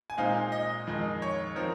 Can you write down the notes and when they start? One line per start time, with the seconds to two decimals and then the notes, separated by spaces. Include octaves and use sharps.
0.10 G#5
0.17 A#2 G#3 C4 D#4 F5
0.52 D#5
0.87 F2 D#3 G#3 D#4
1.22 C#5
1.56 F3 C4 D#4 A#4